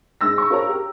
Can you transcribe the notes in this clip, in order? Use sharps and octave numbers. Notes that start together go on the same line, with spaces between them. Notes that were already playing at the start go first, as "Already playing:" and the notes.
G#2 E6 A#6
B5 C#6
F4 F#4 A#4 C#5 A#5
G4